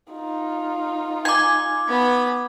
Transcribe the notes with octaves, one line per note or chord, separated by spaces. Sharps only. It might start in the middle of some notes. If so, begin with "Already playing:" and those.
D#4 F4
G#5 D6 G#6
B3 B5